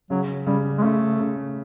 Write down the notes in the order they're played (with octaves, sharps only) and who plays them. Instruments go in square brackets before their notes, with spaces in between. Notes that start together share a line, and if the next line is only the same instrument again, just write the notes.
[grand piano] C#3 [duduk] F#3
[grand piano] C#3 [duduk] G3
[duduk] G#3
[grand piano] C#3 [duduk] A3
[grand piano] C#3